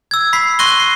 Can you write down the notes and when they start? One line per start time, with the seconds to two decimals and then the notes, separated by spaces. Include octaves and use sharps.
0.11 E6 G#6
0.33 B5 B6 C7
0.59 C6 C#6 F#6 A#6 D#7 G7
0.80 C7